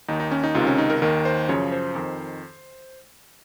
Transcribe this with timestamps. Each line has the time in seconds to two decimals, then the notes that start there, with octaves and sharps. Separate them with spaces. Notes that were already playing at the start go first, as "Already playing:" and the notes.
0.08 D#2 D#3 D#4
0.20 D#4
0.31 C#4
0.44 D#4
0.55 C#2 C3 D#3 F4
0.67 C#4
0.78 D#4
0.90 A#4
1.02 D#2 D#3 A#4
1.25 C5
1.49 F#2 C#3 F3 C#5
1.72 C5
1.95 F2 D#3